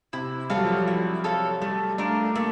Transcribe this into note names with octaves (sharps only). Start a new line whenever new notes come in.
C3 E4
G3 A4 C#5 F5
F#3
F3
F#3
E4
A4 C#5 F5
G3 A3
A3 D4 F4 A#4
A3 A#3